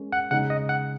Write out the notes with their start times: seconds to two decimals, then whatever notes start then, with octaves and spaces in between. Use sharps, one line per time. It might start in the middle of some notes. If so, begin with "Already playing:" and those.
Already playing: G#3 C#4 A#4
0.13 F#5
0.31 C#3 G#3 D#4 F#5
0.50 D#5
0.69 F#5